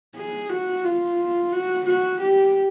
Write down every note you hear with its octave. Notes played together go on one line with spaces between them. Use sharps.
G#4
F#4
F4
F#4
F#4
G4